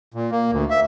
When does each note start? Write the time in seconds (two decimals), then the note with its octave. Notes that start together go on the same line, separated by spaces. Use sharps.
0.14 A#2
0.31 A#3
0.52 D2
0.71 E5